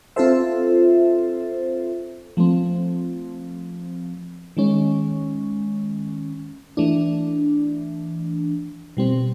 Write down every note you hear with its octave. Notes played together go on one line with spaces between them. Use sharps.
C4 F4 A4 C5 E5
F3 A3 C4
D#3 G#3 C#4
E3 A3 D4
B2 G3 C4